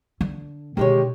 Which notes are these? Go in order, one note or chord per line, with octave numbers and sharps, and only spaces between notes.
D3
B2 D3 D#3 G#3 G4 C#5